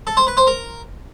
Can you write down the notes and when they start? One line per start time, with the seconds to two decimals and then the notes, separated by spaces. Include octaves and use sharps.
0.07 A4
0.17 C5
0.27 B4
0.37 C5
0.47 A#4